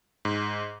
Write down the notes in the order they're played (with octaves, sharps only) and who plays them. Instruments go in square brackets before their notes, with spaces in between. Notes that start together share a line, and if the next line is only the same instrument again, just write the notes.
[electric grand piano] G#2